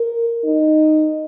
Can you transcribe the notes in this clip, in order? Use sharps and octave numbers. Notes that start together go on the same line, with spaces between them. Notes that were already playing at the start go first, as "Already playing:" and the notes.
Already playing: A#4
D#4